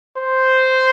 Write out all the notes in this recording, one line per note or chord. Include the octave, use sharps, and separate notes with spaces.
C5